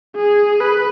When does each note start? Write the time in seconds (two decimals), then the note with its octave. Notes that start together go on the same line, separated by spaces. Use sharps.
0.16 G#4
0.60 B4